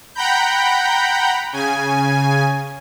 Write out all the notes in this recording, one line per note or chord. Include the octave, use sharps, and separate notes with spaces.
F#5 G5 A#5 B5 G6
C#3 G#5